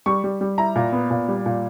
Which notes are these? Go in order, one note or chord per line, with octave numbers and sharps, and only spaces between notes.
G3 C#6
G3
G3
E4 A#5
A#2
B3
A#2
G3
A#2